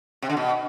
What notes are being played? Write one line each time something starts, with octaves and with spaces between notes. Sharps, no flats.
C3
D3
B2